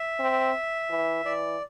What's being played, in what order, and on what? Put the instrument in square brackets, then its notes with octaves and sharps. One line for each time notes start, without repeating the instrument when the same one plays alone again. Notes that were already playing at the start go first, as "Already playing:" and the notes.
Already playing: [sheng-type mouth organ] E5
[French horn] C4
E3
[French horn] E3 [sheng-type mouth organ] D5